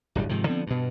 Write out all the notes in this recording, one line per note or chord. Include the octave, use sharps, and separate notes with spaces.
D1 G1 G3
G#2 C3 D#3 F3
D3 F3 B3 C4
G2 B2